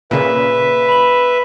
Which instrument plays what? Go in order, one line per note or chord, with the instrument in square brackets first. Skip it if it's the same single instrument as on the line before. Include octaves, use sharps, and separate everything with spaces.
[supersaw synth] A#2 C#3 [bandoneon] B4 E5
[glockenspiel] B5 F#7